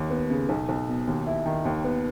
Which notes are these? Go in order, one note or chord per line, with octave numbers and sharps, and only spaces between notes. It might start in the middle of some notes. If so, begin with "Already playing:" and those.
Already playing: D#2
B3
C#3
B1
B1
B2
D#2
E4
D#3
D#2
B3